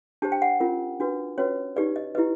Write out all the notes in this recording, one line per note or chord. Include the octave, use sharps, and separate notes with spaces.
D4 G4 C5 A5
G5
F#5
C#4 F4 A#4
D4 F#4 B4
C#4 F#4 B4 C#5
D#4 G4 B4 D5
D#5
E4 G4 B4 D#5